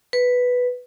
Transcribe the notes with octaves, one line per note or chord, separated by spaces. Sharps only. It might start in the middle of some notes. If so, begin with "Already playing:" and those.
B4